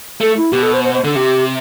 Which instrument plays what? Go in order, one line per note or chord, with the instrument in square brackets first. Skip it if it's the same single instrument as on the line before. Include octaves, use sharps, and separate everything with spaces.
[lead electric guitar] A3 [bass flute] A4
[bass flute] E4
[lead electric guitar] B2 [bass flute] G4
[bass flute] A4
C5
C5
C5
[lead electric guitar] D3 [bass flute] A4
[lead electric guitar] C3 [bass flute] G4